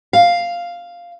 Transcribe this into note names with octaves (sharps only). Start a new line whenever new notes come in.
F5